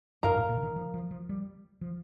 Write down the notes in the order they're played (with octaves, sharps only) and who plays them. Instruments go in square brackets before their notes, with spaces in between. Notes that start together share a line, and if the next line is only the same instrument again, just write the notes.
[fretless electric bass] G2 [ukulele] A#4 F5 A#5
[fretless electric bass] A2
A#2
D3
D#3
F3
F3
F3
G3
F3